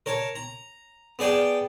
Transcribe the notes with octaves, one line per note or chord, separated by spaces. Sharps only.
A#4 C#5 A5
A#5
B3 G#4 D5 G5 A5